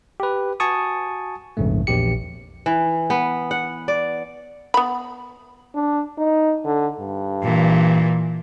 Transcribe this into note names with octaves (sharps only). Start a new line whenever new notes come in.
G4 B4
F#4 G#5 A5 C#6 D#6
A#1 F2 G#2 C#3 A3
A#1 E2 G4 C#7
E3
B3
F#5
D5
B3 B5
D4
D#4
D3
G2
A#2 E3